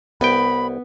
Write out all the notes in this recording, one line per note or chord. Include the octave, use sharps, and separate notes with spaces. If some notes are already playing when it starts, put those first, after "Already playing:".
C2 B3 G5 B5